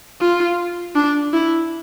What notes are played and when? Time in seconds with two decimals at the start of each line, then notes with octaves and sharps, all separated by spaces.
0.21 F4
0.95 D4
1.33 E4